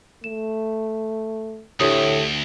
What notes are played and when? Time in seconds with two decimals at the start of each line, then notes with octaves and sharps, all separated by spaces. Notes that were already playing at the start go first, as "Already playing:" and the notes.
0.24 A3 E7
1.80 D2 A2 D4 G4 D#6